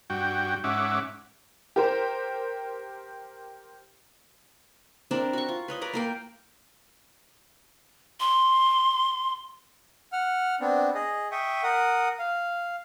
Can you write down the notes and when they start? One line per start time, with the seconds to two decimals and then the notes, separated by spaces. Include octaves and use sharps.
0.10 G2 F#4 G5
0.64 G#2 C#4 E5 F#5 D6
1.76 G4 A#4 C5
5.11 C4 D4 E4 A#4
5.33 F#4 C#6
5.48 F4
5.68 B4 C#5 D#5
5.81 B4 D5 A#5
5.93 A#3 A#4 G5
8.20 C6
10.12 F#5 F6
10.60 B3 C4 D4
10.94 G#4 D#5
11.32 E5 G5 C#6 D#6
11.63 A#4 F#5 D#6
12.19 F5